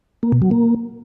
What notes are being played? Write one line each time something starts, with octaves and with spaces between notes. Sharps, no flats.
A#3
B2
F#3
A#3